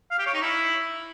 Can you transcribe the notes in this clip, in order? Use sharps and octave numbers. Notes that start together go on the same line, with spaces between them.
F5
G4
C#5
D#4
E4